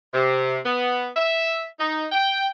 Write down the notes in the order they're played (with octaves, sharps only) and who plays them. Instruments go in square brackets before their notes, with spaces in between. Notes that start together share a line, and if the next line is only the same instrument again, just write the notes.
[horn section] C3
B3
E5
D#4
G5